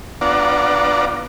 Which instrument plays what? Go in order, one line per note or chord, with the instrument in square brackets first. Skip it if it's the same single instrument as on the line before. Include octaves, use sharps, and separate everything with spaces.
[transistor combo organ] B3 D4 F4 D5 F#5 A#5